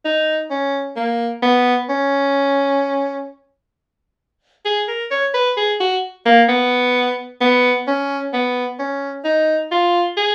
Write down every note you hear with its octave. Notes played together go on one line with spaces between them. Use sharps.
D#4
C#4
A#3
B3
C#4
G#4
A#4
C#5
B4
G#4
F#4
A#3
B3
B3
C#4
B3
C#4
D#4
F4
G#4